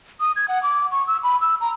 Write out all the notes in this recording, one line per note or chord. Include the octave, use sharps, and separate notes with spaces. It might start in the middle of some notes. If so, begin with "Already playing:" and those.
D#6
G#6
F#5
D6
C#6
E6
B5
E6
A#5